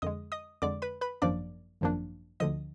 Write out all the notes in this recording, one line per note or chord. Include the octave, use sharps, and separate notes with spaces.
F2 D3 G#3 D#5 D#6
D#5 D#6
F2 D3 G#3 D5 D6
B4 B5
B4 B5
G#1 F#2 F3 A#3 D4 D5 D6
G#1 F#2 F3 A#3 D4
D2 D3 F3 D#5 D#6